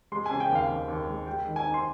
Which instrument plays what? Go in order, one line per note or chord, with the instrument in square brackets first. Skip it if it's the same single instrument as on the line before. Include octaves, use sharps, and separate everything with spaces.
[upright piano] G#3 C6
C#3 G#5
G5
D#2
F5
D#2
D#2
G#3
G#3 G5
D#3
G#5
D#4
C6